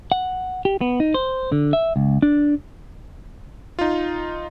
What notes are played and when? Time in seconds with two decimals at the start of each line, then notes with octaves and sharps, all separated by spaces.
0.12 F#5
0.65 G4
0.81 B3
1.00 D#4
1.14 C5
1.52 D3
1.73 E5
1.96 C#2
2.22 D4
3.79 D#4 F4